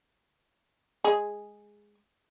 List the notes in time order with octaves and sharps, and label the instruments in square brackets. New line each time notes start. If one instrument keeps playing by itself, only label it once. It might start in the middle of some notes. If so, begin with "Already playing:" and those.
[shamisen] G#3 G#4